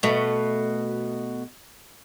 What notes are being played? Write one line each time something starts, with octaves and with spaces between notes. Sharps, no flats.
B2 A3